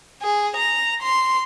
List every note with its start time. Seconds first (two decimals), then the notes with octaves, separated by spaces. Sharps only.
0.22 G#4
0.56 A#5
1.02 C6